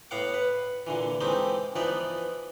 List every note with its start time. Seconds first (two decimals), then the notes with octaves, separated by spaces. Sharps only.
0.11 A2 B3 F5 F#5 D6
0.34 B4
0.87 A#2 D3 E3
1.21 E3 G#3 A3 C4 D#4 G4
1.76 E3 F3 B3 D#4 B4 D5